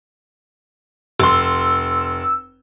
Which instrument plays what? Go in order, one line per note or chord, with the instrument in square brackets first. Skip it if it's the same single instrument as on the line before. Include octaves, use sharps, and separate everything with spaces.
[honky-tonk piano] F1 C6 [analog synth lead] E6